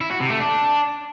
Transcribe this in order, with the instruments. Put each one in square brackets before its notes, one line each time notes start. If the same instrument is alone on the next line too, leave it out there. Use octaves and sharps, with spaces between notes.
[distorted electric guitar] E4
F#4
C3
A3
D4